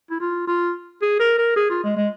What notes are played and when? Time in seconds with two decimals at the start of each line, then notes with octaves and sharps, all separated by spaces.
0.10 E4
0.20 F4
0.47 F4
1.02 G#4
1.19 A#4
1.38 A#4
1.56 G#4
1.70 F4
1.84 G#3
1.97 G#3